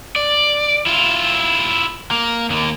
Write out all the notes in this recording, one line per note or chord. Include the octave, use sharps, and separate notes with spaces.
D5
E4 F4
A#3
D#2 A#3